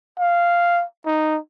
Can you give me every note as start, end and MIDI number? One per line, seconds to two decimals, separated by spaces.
0.19 0.84 77
1.06 1.38 63